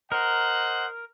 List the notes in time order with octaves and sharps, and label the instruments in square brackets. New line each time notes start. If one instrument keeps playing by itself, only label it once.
[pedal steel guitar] A#4 [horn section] C5 D#5 F#5